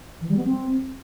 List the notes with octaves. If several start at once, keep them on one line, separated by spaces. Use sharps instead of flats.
E3
G3
B3
C4